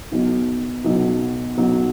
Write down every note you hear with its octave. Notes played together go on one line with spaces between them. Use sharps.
B1 B2 F#3
B1 B2 F#3
B1 B2 F#3